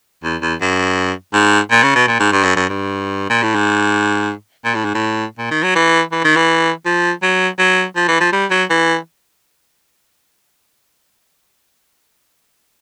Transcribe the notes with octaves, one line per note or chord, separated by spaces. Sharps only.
E2
E2
F#2
G#2
A#2
C#3
B2
A#2
G#2
G2
F#2
F#2
G2
A#2
A2
G#2
A#2
A2
G#2
A2
A#2
D#3
F#3
E3
E3
D#3
E3
F3
F#3
F#3
F3
E3
F3
G3
F#3
E3